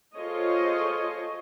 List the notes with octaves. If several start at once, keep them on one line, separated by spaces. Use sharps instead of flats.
F4 G#4 A4 C5 C#5 D#5